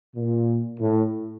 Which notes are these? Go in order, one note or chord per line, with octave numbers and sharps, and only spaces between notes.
A#2
A2